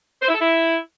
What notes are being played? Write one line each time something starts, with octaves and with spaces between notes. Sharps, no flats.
C5
E4
A4
E4